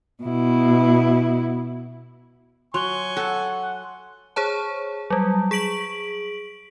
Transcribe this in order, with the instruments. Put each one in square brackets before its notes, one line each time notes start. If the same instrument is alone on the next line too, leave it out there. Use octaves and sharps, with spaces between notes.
[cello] B2 E4
[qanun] F#3 [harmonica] G#5 C#6 [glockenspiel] C6 F#6 G7
[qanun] A4 [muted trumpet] F#5 [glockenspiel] F#6
[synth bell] G#4 C5 C#5 A5
F#3 G3
G#4 B6 D7 F#7